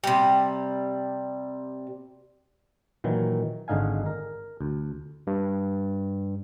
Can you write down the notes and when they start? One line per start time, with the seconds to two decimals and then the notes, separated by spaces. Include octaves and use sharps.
0.04 C3 G3
3.04 A#2 D#3 E3 F#3
3.68 G#1 G#2 D3 D#4 F5 G#5
4.06 A#4
4.61 D2
5.27 G2